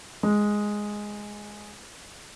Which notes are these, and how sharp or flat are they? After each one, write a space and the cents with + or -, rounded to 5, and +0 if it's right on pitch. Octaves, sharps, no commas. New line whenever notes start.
G#3 +0